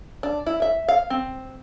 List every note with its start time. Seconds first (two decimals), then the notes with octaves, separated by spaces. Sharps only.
0.23 D4
0.46 E4
0.62 E5
0.89 F5
1.10 C4